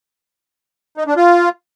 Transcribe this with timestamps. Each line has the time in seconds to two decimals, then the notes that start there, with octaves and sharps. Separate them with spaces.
0.97 D#4
1.07 D4
1.17 F4